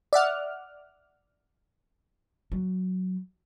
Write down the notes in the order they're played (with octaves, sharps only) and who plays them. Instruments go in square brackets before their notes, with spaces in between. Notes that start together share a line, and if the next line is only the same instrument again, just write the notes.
[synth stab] D5 E5 F#5 F6
[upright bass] F#3